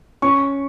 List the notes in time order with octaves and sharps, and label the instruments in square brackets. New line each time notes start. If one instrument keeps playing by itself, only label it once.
[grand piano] C#4 C#6